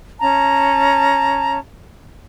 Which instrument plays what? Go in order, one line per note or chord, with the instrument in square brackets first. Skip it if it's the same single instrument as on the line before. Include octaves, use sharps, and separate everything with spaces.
[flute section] C#4 A5 A#5